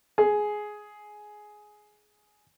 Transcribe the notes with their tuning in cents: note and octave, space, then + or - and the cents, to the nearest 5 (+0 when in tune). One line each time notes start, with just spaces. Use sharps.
G#4 +10